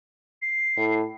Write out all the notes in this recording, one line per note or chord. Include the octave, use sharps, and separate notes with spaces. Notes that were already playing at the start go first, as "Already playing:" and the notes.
C7
A2